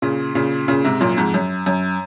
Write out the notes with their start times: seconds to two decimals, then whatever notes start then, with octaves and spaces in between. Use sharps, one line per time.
0.02 A#2 C#3
0.35 A#2 C#3
0.68 A#2 C#3
0.84 G#2 C3
1.01 F#2 A#2
1.17 F2 G#2
1.34 F#2
1.66 F#2